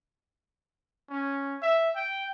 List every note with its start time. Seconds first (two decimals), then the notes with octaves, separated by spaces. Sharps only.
1.10 C#4
1.62 E5
1.96 G5